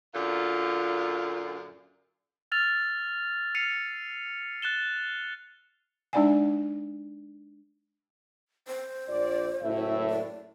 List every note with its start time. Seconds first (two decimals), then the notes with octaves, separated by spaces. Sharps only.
0.14 F#2 A#2 D3 F4
2.52 E6 F6 A6 F7
3.55 F6 C7 C#7 D#7 F7
4.62 F#6 A6 E7 G7
6.13 G#3 D4 D#4 D5 F#5 G#5
8.68 C5
9.09 A#1 D5
9.62 F#1 A2 E5
10.10 D5